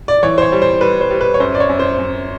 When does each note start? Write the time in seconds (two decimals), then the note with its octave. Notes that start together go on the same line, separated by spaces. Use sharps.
0.08 D5
0.23 E3 C#5
0.38 C5
0.42 C#5
0.52 G3
0.62 C5
0.81 G3 B4
1.01 C5
1.11 G3
1.21 B4
1.34 C#5
1.40 F#2 C5
1.55 D5
1.60 C#5
1.69 F#2
1.79 C5
1.99 F#2